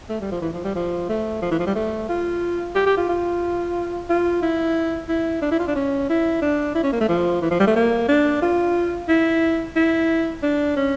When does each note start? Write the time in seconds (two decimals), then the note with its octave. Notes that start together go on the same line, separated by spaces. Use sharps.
0.09 A3
0.21 G3
0.31 F3
0.42 E3
0.53 F3
0.64 G3
0.75 F3
1.09 A3
1.42 F3
1.51 E3
1.59 F3
1.67 G3
1.75 A3
2.09 F4
2.75 G4
2.86 G4
2.97 F4
3.09 F4
4.09 F4
4.42 E4
5.09 E4
5.42 D4
5.51 E4
5.59 F4
5.68 D4
5.75 C#4
6.09 E4
6.42 D4
6.75 E4
6.83 C#4
6.92 A#3
7.00 A3
7.08 F3
7.42 E3
7.51 F3
7.59 G3
7.67 A3
7.76 A#3
8.08 D4
8.42 F4
9.08 E4
9.76 E4
10.43 D4
10.76 C#4